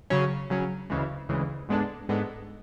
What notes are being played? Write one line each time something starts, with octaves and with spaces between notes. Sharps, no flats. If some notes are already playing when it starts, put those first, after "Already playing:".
C#3 F#3 C#4
C#3 F#3 C#4
D2 C#3 E3 G#3
D2 C#3 E3 G#3
G#2 G#3 B3 D4 A4
G#2 G#3 B3 D4 A4